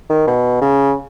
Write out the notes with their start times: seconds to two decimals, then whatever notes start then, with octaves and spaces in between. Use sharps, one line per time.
0.10 D#3
0.27 B2
0.62 C#3